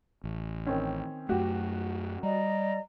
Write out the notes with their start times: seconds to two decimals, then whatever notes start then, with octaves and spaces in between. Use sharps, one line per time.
0.24 A1
0.66 D#3 C4 C#4
1.29 F#2 A3 F#4 G4
2.23 G3 D5 D#5 A#5